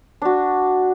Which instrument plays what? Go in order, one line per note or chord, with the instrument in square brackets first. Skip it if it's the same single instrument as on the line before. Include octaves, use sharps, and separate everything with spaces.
[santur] D4 F#4